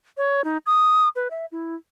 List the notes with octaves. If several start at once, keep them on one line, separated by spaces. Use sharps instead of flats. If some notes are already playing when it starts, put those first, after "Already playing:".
C#5
D#4
D#6
B4
E5
E4